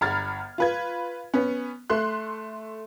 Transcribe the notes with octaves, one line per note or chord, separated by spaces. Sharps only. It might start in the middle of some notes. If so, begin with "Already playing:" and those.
G1 A#5 B5 F6 G#6 A6
F4 B4 G#6
B3 C#4
A3 C6 F#6